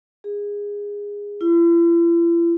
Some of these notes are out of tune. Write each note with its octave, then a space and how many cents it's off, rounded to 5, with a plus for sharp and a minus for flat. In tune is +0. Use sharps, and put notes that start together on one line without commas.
G#4 -20
E4 +45